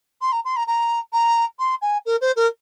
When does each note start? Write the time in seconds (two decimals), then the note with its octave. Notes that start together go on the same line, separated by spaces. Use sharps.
0.21 C6
0.32 A#5
0.45 C6
0.56 A#5
0.67 A#5
1.13 A#5
1.59 C6
1.82 G#5
2.05 A#4
2.21 C5
2.36 A#4